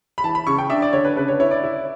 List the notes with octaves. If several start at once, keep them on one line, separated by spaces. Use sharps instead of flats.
B5
E3 A5
B5
C#3 C#6
G5
D4 E5
D5
D3 C#5
B4
C#3 B4
C#5
E4 C#5
D5
E4